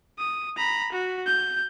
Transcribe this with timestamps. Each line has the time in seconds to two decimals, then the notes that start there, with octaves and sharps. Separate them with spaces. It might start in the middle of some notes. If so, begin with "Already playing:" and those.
0.19 D#6
0.57 A#5 B5
0.93 F#4
1.26 G6